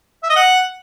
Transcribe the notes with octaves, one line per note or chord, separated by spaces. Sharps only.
E5
D#5
F#5